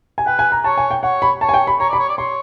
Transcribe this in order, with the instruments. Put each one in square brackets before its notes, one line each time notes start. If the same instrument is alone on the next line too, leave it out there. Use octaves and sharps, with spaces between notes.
[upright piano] G#5
[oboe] B4 [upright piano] G5
[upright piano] G#5
A#5
[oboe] C#5 [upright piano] A5
[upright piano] G#5
G5
[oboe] C#5 [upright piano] F#5
[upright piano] B5
[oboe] C#5 [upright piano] A5
[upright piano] G#5
G5
B5
[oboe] C#5 [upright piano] A#5
[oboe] D5
[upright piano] B5
[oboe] C#5
D5
[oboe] C#5 [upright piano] C6